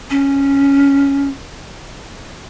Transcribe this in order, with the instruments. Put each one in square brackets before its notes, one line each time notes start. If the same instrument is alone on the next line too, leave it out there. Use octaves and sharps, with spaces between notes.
[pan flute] C#4